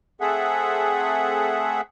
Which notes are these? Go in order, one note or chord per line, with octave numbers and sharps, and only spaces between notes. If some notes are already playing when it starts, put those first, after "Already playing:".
A3 C4 G#4 A4 E5 F#5